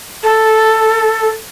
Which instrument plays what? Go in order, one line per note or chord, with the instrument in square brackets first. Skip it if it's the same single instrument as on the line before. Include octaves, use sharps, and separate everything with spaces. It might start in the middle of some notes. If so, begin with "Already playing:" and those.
[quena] A4